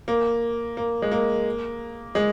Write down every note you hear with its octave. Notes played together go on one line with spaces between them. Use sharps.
A#3
A#3
G#3
A#3
G#3